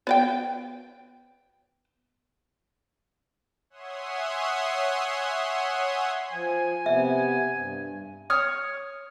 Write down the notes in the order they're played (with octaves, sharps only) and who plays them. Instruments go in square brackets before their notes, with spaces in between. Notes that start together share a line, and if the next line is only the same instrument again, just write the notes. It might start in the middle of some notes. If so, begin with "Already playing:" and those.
[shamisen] B3 D5 G5
[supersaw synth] C#5 E5 F#5 G#5 C6 D#6
[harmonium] F3 [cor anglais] G#5
[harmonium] C3 B3 [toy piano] E5
[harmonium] G2
[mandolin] C#5 D#6 F6